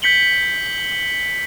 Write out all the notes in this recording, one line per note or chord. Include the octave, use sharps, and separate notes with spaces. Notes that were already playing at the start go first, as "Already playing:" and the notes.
G6 B6 C#7 F#7 G7